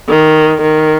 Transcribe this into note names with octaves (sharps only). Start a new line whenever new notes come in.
D#3
D#3